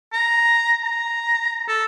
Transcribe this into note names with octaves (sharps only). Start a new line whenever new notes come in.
A#5
A#5
A4